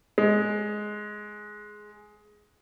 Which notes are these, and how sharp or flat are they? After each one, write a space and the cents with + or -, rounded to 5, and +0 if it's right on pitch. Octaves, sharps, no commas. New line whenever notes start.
G#3 +10